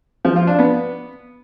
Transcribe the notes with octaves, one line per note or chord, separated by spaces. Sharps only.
F3
F4
D4
B3